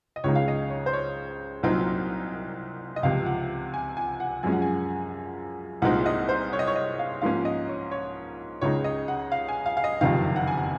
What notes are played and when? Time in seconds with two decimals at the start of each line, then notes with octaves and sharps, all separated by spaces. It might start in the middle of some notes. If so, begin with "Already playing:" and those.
0.16 D#5
0.24 C#2 C#3 G#3 D#4 C#5
0.35 F5
0.48 D#5
0.70 C#5
0.86 C5
0.93 C#5
1.63 C2 A#2 F#3 C4 D#4
2.96 D#5
3.03 C#2 C3 F3 F5
3.26 F#5
3.74 G#5
3.97 G#5
4.20 F#5
4.43 F#2 F3 G#3 C#4 G#5
4.52 F#5
4.62 G#5
5.82 C2 A#2 G#3 C4 D#4 F#5
6.06 D#5
6.29 C5
6.53 C#5
6.59 D#5
6.67 C#5
6.76 D#5
6.99 F5
7.22 G#2 F3 A#3 C#4 F5
7.45 D#5
7.69 C#5
7.91 C#5
8.61 C#2 C#3 G#3 D#4 C#5
8.84 D#5
9.08 F#5
9.32 F5
9.49 G#5
9.66 F5
9.77 F5
9.84 D#5
10.01 F#1 F2 C3 D#3 F5
10.36 F#5
10.48 G#5
10.57 F#5